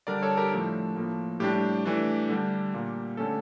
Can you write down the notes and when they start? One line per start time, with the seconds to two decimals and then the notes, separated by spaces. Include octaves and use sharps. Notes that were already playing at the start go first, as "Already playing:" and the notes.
0.07 D3 G3 D4 A#4 D5
0.22 A4 C#5
0.37 G4 A#4
0.51 A2 F3 A3 D4 A4
0.96 A2 F3 A#3
1.40 A2 G3 D4 G4
1.85 E3 A3 D4
2.29 D3 G3 D4
2.74 A#2 G3 A#3
3.17 D3 A3 C#4 A4